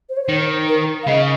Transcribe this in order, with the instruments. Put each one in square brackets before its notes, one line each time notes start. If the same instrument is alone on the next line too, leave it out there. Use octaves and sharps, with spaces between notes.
[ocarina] C5
C#5
C5
[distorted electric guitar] D#3
[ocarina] A#4
F5
[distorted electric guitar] C#3 [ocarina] D#5